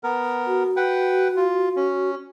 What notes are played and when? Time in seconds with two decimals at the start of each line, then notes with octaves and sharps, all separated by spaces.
0.04 B3 A#4
0.46 F#4
0.76 B4 F#5 G5
1.36 F4
1.76 C#4